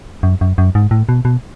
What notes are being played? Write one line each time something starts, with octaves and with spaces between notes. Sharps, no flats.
F#2
F#2
F#2
G#2
A2
B2
B2